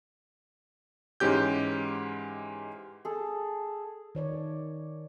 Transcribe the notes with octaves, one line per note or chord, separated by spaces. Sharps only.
G#2 E3 G#3 C#4 G4 G6
G#4 A4
D#3 C#5 D5